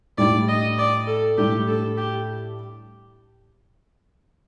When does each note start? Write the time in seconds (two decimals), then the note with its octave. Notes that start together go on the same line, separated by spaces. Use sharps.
0.18 A2 G3 D4 D5
0.48 D#5
0.78 D5
1.07 A4
1.38 A2 G3 D4 G4
1.68 A4
1.97 G4